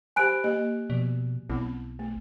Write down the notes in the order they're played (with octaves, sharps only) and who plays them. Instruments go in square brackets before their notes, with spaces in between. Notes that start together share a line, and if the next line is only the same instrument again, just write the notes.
[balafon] G4 C5 B5 [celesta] G#5 F#6 D7
[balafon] A#3 G4 D#5
[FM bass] B2 [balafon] F3
[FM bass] B1 [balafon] B3 C4 E4
[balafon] A3